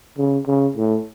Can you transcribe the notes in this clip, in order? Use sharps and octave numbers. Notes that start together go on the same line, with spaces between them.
C#3
C#3
A2